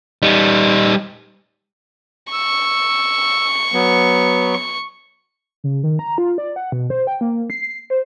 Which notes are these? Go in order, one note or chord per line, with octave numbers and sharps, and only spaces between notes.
G3 D#4
C#6 E6
F#3 B3
C#3
D#3
A#5
F4
D5
F#5
B2
C5
G5
A#3
C7
C5